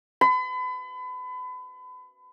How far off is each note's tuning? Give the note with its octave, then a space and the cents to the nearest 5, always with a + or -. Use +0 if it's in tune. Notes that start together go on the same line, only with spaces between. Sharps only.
B5 +35